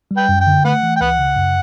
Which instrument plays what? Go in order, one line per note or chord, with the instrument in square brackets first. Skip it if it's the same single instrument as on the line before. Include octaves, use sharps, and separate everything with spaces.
[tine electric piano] G3
[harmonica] B4 G5
[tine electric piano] F#2
[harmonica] G5
[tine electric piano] D3
[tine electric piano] A3 [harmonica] B4 F#5
[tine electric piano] E3
[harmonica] G5
[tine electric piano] C#2 [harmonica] B4 F#5
[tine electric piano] C#3
F#2